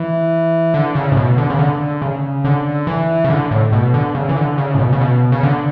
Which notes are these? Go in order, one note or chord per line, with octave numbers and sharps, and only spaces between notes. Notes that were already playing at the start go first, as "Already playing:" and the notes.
Already playing: E3
D3
C#3
A2
B2
D3
C#3
D3
C#3
D3
E3
C#3
D3
A2
B2
D3
C#3
E3
D3
C#3
A2
B2
C#3
B2
C#3
D3